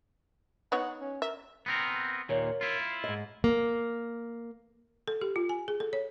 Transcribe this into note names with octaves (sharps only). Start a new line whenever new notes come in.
B3 D#4 C#5 F#5
C#4
A#4 E5
B3 C4 A#4
D#2 A#2 A#4 C#5
E4 F4
G#2 D#5
A#3
A4
G4
F4
G#5
G#4
A4
C#5